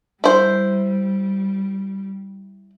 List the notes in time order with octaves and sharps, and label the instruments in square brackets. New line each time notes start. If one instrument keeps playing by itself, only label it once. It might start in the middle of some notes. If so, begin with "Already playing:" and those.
[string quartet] G3 [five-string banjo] E4 C5